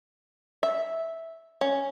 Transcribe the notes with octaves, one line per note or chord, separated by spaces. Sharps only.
E5
C#4